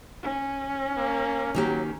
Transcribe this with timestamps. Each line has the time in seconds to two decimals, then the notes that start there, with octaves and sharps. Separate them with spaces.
0.23 C#4
0.97 A#3
1.55 D#3 F#3 A#3 G4